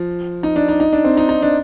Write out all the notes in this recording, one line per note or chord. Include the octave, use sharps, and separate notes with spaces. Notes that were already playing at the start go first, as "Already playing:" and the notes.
Already playing: F3
D#4
D4
D#4
D#4
D4
C4
D#4
D#4
D4